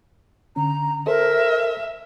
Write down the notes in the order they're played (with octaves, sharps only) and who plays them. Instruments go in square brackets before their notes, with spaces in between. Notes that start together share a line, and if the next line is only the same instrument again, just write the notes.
[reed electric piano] D3 C#4 [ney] A#5
[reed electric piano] A4 C5 [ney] A#4 [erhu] E5